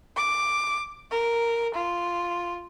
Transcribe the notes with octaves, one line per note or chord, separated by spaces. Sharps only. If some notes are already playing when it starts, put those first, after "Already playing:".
D6
A#4
F4